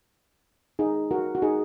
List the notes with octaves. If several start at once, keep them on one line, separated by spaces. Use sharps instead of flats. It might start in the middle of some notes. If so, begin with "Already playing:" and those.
D#4 G#4
F#4 A#4
F#4
D#4 G#4